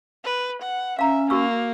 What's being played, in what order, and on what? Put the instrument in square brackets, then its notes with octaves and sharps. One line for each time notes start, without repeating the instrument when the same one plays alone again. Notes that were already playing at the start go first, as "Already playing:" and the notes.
[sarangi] B4
F#5
[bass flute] C#4 [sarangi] E5 [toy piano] F5 A#5
[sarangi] A#3 [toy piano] F#4 C#6 E6